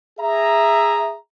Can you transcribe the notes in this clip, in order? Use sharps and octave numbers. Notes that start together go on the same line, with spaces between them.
G#4 E5 A#5